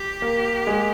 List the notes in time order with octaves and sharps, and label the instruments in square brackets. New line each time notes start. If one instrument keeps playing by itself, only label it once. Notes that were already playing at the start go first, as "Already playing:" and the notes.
Already playing: [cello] G4
[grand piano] A#3
G#3